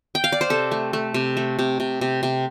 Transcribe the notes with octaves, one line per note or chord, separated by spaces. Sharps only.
G5
F5
D5
C5
C3 A4
A3
A3
C3
A3
C3
C3
C3
C3